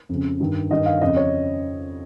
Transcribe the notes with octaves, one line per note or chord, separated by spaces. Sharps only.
F2 C#3
G2 D#3
G2 D#3 D#5
F5
F2 C#3 D#5
C#5